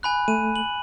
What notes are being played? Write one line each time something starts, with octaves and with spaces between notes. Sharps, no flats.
G#5 B5 F#6
A3 D#7
F#7